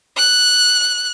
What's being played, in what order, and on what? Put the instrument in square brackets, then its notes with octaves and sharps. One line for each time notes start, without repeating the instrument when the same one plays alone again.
[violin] F#6